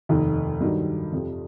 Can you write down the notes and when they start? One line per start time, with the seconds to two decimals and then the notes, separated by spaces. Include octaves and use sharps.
0.09 F1 D#2 D#3
0.60 G2 D#3 F#3
1.12 F2 C3 F3